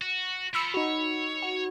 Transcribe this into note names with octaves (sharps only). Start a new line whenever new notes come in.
F#4
F3 B5 E6 C#7
D#4 F#4 C#5
F#4